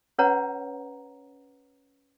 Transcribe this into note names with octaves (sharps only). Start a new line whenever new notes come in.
C#4 B4 C#5 F#5 A#5